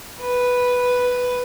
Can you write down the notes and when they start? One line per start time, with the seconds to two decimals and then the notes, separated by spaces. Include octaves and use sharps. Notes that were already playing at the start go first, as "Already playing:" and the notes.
0.20 B4